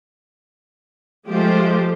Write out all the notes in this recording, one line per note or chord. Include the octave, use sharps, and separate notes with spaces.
F3 G#3 A3 F4 G4 C5